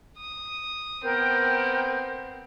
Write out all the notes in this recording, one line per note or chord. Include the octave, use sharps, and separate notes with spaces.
D#6
B3 C4 A#4 G5 G6